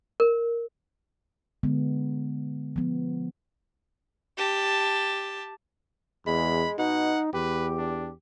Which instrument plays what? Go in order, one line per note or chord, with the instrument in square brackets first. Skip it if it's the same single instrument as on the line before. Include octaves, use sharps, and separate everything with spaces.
[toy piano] A#4
[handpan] D3 G#3 B3
F3 B3
[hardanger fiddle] G4 A5
[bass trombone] E2 [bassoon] G#3 [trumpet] B5
[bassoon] B2 [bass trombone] D#4 [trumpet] F#5
[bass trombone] E2 [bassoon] G4 [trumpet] B4
[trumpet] D4